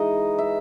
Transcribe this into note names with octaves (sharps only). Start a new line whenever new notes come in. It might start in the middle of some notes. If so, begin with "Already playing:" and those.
Already playing: E3 G#3 D#4 D#5
E5